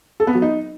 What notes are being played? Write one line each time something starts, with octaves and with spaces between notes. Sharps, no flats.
A4
B3
F#3
D#4